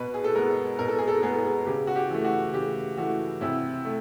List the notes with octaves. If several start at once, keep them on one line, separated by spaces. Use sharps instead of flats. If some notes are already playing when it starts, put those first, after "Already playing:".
Already playing: B2 B4
G#4
A4
G#3 B3 A#4
B2 A#4
A4
G#4
A4
G#3 B3 G#4
A4
G#4
C#3 G4
F#4
G4
E3 A3
F#4
C#3 G4
E3 A3 F#4
C3 E4
A3